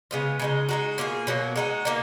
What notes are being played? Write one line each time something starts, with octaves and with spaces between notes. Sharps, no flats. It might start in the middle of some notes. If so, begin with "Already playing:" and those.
C#3 G#3 B3 F4
C#3 G#3 D#4
G#3 D#4 F#4
B2 A#3 F4 G#4
B2 F#3 A#3
G#3 D#4 F#4
B2 A#3 D#4